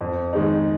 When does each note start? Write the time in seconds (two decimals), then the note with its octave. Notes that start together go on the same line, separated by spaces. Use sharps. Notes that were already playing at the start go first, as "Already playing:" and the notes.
0.01 F2
0.33 D#3 G#3 D#4